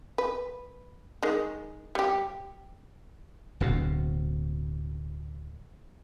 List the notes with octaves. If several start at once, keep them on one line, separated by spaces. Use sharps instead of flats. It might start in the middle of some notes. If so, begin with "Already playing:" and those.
B4
D#3 G#3
G3 G4
D1 D2 B2